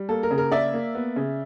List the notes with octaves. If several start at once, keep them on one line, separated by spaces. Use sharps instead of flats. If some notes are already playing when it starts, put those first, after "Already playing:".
Already playing: G3
A#3 A4
A#4
C#3
A#4
A#3 D5 E5
A#3
B3
C#3